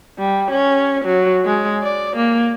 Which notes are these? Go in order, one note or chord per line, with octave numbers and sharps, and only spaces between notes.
G3
C#4
F#3
G#3
D5
A#3